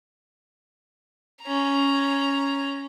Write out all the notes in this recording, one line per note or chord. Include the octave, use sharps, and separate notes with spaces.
C#4 A#5